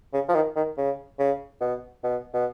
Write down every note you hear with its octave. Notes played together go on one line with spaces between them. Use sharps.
C#3
F3
D#3
D#3
C#3
C#3
B2
B2
B2